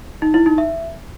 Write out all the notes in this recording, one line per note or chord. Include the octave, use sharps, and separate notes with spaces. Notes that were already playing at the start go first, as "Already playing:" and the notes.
D#4
E4
D#4
E5